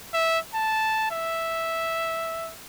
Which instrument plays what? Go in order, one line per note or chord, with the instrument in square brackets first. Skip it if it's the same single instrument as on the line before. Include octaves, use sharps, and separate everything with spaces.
[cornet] E5
A5
E5